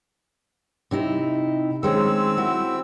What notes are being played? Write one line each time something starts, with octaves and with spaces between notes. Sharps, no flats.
C3 D#4 E4
D#3 G#3 C4 C#4 E6
E4 F#4